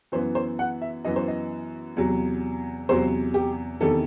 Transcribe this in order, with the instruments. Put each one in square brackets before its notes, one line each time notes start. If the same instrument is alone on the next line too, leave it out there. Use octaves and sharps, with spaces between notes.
[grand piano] F#2 E3 B3 C5
C5
F#5
E5
F#2 E3 B3 D#5
C5
D#5
E2 C3 F#3
E2 C3 F#3 C5
G4
E2 C3 D#3 A4